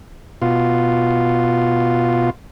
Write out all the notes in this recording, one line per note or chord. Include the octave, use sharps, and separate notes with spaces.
B2 F4